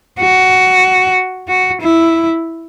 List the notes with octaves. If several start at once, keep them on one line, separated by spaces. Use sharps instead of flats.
F#4
F#4
E4